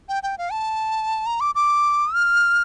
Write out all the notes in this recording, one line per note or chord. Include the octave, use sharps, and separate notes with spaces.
G5
G5
F5
A5
A#5
D6
D6
F6